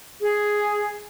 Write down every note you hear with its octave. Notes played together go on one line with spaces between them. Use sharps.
G#4